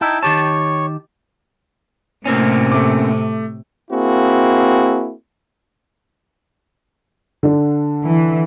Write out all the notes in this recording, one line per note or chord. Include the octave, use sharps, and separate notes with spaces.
D#4 E4 G5 A5
D#3 G4 C#5 A5
A2 C3 A#3 C4 C#4
A3 D6
A#3 C4 E4 F#4 G#4
D3 D4
E3